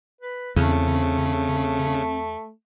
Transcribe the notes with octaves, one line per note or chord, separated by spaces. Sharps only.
B4
E2 C#3 A3 C4